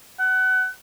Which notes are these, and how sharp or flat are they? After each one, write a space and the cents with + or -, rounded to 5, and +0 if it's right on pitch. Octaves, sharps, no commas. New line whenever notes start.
F#5 +25